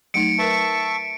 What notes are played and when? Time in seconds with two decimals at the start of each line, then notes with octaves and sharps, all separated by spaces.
0.14 F#3 A3 D#4 C#7 D7
0.39 A#4 B4 E5 A5 C#6